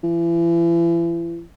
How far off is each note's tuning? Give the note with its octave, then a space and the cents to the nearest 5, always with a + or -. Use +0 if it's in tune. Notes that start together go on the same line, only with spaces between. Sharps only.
E3 +40